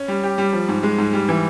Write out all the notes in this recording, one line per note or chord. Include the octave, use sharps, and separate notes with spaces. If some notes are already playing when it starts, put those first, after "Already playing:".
Already playing: C#4
G3
G4
G3
F3
G#2
G#3
G#2
G3
E3